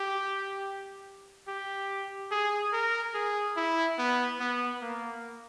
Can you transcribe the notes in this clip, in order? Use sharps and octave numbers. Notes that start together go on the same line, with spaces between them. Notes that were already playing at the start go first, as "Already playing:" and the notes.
Already playing: G4
G4
G#4
A#4
G#4
E4
B3
B3
A#3